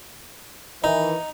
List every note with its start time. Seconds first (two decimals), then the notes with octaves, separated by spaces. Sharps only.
0.84 D#3 E3 D#4